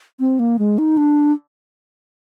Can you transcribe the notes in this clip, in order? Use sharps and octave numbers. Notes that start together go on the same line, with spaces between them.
C4
A#3
G#3
D#4
D4